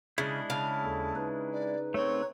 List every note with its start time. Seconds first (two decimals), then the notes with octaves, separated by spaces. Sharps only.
0.18 C#3 G#3 D4 E4
0.50 C#3 F5 A5
0.83 D#2 A4
1.16 D#4 B4
1.52 D5
1.94 A3 C4 C#5